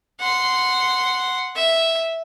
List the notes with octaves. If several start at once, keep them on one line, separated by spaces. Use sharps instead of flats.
F#5 C6
E5